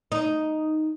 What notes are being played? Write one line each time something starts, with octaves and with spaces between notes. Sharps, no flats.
D#4